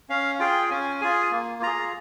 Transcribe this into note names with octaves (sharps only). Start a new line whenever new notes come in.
C#4 F5
F4 G#4 G5
C#4 G#5
F4 G#4 G#5
A#3
F4 G#4 A#5